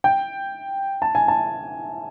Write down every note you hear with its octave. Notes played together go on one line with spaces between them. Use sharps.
G5
A5
G#5
A5